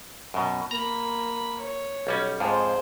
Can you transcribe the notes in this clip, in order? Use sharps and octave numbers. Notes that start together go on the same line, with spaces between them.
F#2 B2
A#3 A#5 B5
C#5
B1 G3 C#4
F2 G#2 F3 G#4 C5